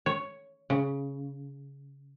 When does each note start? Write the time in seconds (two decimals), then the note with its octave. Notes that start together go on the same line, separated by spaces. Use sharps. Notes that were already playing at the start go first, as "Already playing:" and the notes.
0.06 C#5
0.70 C#3